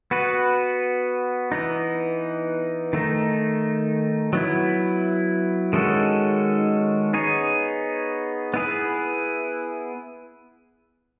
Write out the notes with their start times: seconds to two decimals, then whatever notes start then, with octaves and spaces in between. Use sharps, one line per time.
0.11 B3 F#4 B4
1.52 E3 B3 D#4
2.93 D#3 A3 D#4
4.33 F#3 B3 E4
5.73 D#3 G#3 C#4 F#4 A4
7.13 B3 D#4 G#4 C#5
8.54 B3 E4 G#4 B4